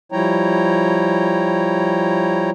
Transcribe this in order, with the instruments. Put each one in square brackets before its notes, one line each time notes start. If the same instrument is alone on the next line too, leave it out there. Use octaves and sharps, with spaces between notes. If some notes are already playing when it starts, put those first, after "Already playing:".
[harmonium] F3 G3 E4 C#5 G5 A#5